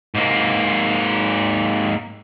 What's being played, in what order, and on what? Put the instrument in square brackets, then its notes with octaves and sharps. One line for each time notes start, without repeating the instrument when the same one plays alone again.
[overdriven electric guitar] G#2 A#3